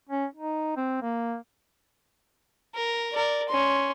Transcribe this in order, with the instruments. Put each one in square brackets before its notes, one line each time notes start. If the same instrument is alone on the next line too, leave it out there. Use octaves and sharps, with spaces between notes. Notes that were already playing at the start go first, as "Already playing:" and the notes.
[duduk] C#4
D#4
C4
A#3
[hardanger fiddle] A#4
A#4 D5
C#4 C6